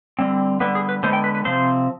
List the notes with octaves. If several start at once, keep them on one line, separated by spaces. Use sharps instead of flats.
D3 G3 C4
D3 G3 B3 B4
G#4
B4
D3 G#3 B3 C5
G5
B4
B4
C3 F3 C4 C5